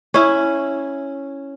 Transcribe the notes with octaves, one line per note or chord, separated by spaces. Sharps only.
C#4 E4